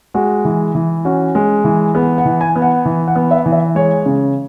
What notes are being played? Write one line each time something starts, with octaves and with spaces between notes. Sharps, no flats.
G#3 F#4
E3
E3
C#4 F#4
G#3
E3
B3 G#4
F#5
E3
G#5
B3
F#5
E3
F#5
B3
E5
E3
E5
G#3 C#5
C#3